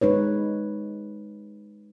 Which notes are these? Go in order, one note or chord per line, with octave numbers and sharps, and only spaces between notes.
G#3 D#4 B4 C#5